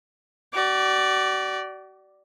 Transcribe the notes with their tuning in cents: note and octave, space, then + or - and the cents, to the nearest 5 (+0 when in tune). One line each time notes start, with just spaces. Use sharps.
F#4 +45 D5 +0